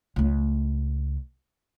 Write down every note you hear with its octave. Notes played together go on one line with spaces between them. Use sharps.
C#2 A3